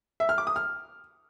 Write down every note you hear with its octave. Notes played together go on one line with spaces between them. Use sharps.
E5
F6
D6
D#6
F6